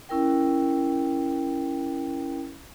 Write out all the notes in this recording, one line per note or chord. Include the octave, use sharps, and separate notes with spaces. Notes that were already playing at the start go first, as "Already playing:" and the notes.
C#4 E4 A#4 G5